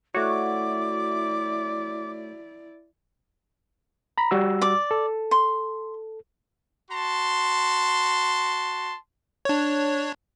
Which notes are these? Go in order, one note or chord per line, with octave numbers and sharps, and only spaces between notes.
A3 E4 F#4 C#5 D5 D6
A#5 B5
G3 F#4 E6
D5 D6
A4
C6
F#4 A5 C6
D4 C#5